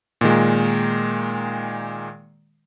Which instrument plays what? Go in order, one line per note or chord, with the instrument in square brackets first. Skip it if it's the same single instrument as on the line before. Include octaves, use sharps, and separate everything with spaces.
[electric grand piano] A#2 D#3 G#3